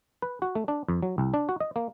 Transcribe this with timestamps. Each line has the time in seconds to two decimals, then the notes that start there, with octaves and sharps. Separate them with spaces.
0.22 B4
0.42 F#4
0.55 A3
0.68 D4
0.89 F2
1.03 F#3
1.18 C2
1.34 D4
1.49 F#4
1.60 D#5
1.76 A#3